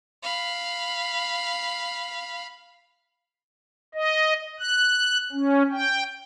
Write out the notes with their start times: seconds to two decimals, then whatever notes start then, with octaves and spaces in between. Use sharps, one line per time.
0.23 F5 B5
3.95 D#5
4.59 F#6
5.32 C#4
5.71 G5